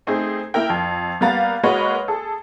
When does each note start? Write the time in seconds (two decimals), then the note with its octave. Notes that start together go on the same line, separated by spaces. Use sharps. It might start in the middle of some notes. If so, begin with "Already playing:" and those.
0.07 A3 C4 D#4 G#4
0.54 A#3 E4 A#4 G5
0.70 F2
1.21 G3 A#3 B3 F5 A#5 A6
1.63 G#3 A#3 F#4 B4 C#5 D#5
2.08 G#4 A4